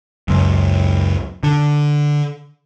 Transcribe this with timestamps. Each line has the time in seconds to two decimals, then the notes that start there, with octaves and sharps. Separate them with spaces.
0.28 C#2 F#2
1.43 D3